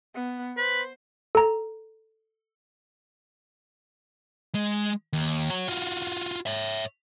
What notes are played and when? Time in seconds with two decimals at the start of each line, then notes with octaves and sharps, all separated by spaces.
0.15 B3
0.57 B4 C5
1.35 A4 A#5
4.55 G#3
5.13 D#2
5.50 F#4 C#5
5.68 F4 F#4
6.46 C#5 E5